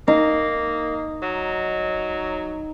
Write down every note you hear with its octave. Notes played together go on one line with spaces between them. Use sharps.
A#3 D#4
F#3